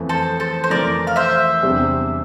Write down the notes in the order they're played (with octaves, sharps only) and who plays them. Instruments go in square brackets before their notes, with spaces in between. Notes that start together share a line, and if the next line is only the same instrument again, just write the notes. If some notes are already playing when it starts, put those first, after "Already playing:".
Already playing: [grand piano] F2 E3 A3
[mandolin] A4 C5
A4 C5
C5
[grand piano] F2 E3 A3 [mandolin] A#4 D5
[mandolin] F5
C5 E5
[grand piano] E2 C3 G3 D4 G4